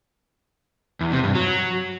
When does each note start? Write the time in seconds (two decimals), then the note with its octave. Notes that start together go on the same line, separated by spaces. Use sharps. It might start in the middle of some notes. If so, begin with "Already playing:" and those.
1.01 E2
1.12 C3
1.23 G2
1.35 F#3